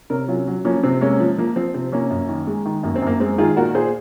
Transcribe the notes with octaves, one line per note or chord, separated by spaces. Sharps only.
C3 A#4 C#5
F#3 C#4 F4
F#3
F3 A#3 C#4
C3 C4
G#3 A#3 C#4
F3
F3 A#3
F3 C4
C3 C4
F3 A#3 C#4
F#2
D#3
G#3
D#3
F#2 A#3
C4
F#2 A#3
G#3 C4
D#3 F4 G#4
A#2 F#4 A#4
A#2 G#4 C5